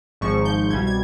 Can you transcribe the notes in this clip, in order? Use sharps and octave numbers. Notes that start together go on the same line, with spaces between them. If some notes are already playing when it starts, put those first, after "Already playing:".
G#1 G#2 F3 C#6
G6
C2 B2 G3 G#6
G#6